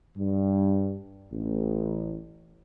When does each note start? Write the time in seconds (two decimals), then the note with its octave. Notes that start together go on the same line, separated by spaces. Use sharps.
0.17 G2
1.32 A1